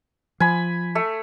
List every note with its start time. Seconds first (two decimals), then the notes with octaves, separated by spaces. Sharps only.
0.40 F3 G#5 B5
0.95 A3